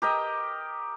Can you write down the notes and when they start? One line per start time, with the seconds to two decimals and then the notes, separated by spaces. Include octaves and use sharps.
0.02 G4 A#4 D#5